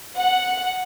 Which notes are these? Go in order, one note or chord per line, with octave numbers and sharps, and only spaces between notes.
F#5